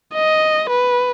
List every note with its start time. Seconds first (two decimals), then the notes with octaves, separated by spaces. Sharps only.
0.15 D#5
0.70 B4